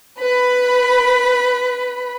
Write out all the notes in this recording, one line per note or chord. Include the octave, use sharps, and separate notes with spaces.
B4 B5